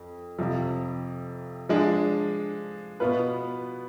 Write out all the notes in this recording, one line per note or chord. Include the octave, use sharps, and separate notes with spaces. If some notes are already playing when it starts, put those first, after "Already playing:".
Already playing: F2
F2 C3 F3
F3 G#3 D4
B2 B3 F4 B4